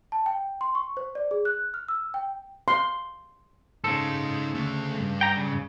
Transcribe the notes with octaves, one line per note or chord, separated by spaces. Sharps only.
A5
G5
C6
C#6
C5
D5
G#4
F#6
F6
E6
G5
C6
C#3 D#4 A4 C5
D2 A3
G2
G5 A#5
C#3